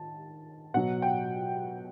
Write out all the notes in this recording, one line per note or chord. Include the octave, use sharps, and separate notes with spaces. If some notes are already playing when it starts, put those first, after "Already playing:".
Already playing: D#3 A5
B2 F#3 F#5
G5